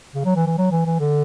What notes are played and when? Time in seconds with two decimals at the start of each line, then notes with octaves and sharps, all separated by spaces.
0.15 C#3
0.25 F#3
0.36 E3
0.47 E3
0.58 F#3
0.71 E3
0.86 E3
1.00 D3